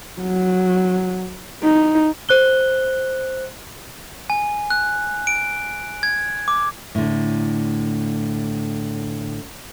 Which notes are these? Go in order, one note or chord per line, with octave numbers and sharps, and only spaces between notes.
F#3
D#4
C5 F#6 G7
G#5
F#6
D7
G#6
D6
A2 D3